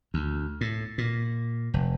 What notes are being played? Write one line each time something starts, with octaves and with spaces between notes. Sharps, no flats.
D2
A2
A#2
F1